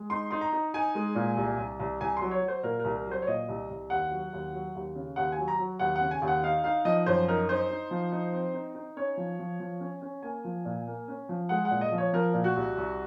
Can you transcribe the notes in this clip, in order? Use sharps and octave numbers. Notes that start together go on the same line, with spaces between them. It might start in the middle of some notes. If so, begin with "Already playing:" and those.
Already playing: G#3
D#4 C6
D#4 C6
A#5
D#4
D#4 G#5
G#3
A#2
C2
C2
C2
C2 G#5
F#3 C6
C#5
F#3
C5
A#2 A#4
C2 A#4
A#4
F#3
C5
C#5
A#2 D#5
C2
C2
D#2 F#5
F#3
D#2
F#3
D#2
C#3
D#2 F#5
G#5
F#3
A#5
F#3
D#2 F#5
F#5
C#3
G#5
D#2
F#5
D#4 F5
D#4 F5
F3 D#5
F#2 C5
D#4 A#4
D#4 C5
D#4
F3
D#4
C4
D#4
D#4
C#4 C#5
F3
F3
F3
C#4
C#4
A#3 G#5
F3
A#2
A#3
C#4
F3
G#3 F#5
F#5
A#2
D#5
F3
C#5
F3 A#4
A#2
F#4
C2
C2